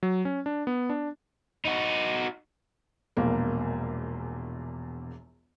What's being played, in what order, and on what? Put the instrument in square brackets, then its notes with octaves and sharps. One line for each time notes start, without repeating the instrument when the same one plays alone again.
[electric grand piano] F#3
C#4
D4
B3
D4
[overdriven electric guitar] D#4 F#4
[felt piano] E1 A#1 E2 A#3